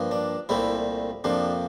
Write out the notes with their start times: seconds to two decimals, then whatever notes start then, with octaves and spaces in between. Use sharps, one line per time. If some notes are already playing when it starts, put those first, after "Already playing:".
Already playing: G2 F3 A#3
0.11 D4
0.49 C2 A#2 A3 C4 E4
1.24 F2 C3 F3 A#3 D4